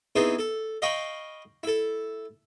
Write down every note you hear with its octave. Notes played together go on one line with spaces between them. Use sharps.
E3 B3 C4 D#4 G#4
A4
D#5 F5 G5 B5 C#6
E4 A4